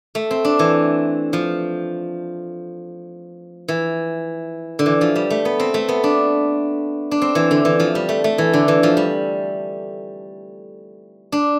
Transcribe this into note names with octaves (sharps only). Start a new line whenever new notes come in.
A3
C4
D4
E3
F3
E3
D3
E3
F3
G3
A3
B3
C4
A3
B3
D4
D4
C4
E3
D3
E3
F3
G3
A3
A3
E3
D3
E3
F3
G3
D4